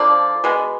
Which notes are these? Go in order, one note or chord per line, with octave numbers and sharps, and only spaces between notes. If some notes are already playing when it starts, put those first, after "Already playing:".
Already playing: D3 F3 A#3 D5
B2 G#3 B3